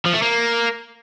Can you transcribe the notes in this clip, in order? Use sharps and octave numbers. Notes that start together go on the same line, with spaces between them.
F3
A3
A#3